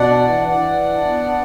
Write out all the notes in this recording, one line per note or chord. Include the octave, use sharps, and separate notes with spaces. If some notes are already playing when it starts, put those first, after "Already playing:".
Already playing: B2 D4 D5 F#5
E3
E3 D5 F#5
D4
B3